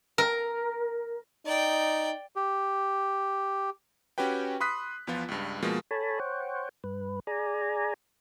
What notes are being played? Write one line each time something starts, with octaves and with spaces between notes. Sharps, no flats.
A#4
D#4 D5 G5
G4
C#4 F#4 G4 B4 G5
B5 C6 D#6 F#6 B6
E2 F3 B3 F4
C#2 G2
B2 F3 G#3 A#3
A4 C#5 G#5 A5 B5
C5 C#5 F#5 G5
G2 B4
G#4 D5 G#5 A#5